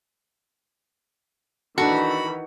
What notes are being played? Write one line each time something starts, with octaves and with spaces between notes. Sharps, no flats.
D#3 E3 D4 F#4 A4 B5